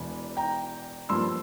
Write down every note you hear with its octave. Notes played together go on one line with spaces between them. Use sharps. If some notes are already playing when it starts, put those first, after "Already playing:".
Already playing: E1 E2 E3
G5 A#5
G2 F3 A#3 C6 E6